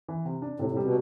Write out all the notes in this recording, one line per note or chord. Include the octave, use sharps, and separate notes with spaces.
E3
C3
D4
A2 C3
A2
G3
B2